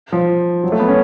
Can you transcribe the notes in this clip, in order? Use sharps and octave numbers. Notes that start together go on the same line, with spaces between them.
F3
F#3
A3
B3
C#4